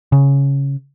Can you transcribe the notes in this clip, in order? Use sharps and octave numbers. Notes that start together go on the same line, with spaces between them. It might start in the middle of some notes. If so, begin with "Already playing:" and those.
C#3